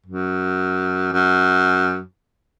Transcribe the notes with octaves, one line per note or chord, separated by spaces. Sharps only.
F#2
F#2